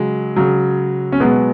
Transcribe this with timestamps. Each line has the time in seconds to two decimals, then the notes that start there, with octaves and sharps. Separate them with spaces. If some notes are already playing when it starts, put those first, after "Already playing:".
Already playing: C#3 F#3 G#3
0.36 C#3 F#3
1.12 C#4
1.20 B2 F#3 G#3 B3